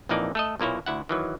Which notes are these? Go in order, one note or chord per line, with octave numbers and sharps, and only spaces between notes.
A#1 F2 E3 A#3 D#4 D5
A3 A4 D#5
B1 A#2 A#3 E4 C#5
D2 E4 F#5
D#3 E3 F#3